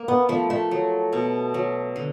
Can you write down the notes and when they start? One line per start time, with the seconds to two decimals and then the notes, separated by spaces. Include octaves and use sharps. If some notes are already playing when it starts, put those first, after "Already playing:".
Already playing: A#3
0.08 B3
0.29 F3 A3
0.50 A3
0.71 F#3
1.13 B2
1.54 F#3
1.96 D3